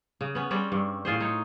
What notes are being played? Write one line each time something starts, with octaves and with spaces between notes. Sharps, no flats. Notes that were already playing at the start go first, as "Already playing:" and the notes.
C#3
B3 C#4
G3 C4 C#4 D5
G2
A2 F4 G#4 C5
D#4 C#5